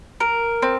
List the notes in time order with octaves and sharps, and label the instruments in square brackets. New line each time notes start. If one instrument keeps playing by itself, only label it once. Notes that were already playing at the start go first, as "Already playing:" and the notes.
[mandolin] A#4
C4